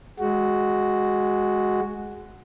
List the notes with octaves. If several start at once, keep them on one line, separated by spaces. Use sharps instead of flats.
G#3 F#4